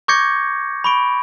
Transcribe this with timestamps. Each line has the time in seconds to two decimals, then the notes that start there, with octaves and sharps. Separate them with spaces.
0.08 C#6 D6 G6 G#6 A#6 C#7
0.84 B5 C#6 D7